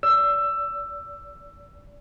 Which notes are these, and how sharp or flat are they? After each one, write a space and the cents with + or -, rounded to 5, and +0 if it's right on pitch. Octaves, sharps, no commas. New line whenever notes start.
D5 -30 E6 +15